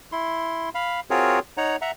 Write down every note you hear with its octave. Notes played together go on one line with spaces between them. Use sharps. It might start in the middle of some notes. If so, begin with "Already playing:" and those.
E4 C6
F5 B5
C4 F4 F#4 G#4 A#4 C#5
D#4 C#5 F#5 A#5
E5 F#5 A#5